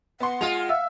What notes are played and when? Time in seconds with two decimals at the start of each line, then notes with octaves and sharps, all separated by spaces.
0.20 B3 F#5 C6
0.41 G#3 F4 F7
0.69 E5 F5 E6 F6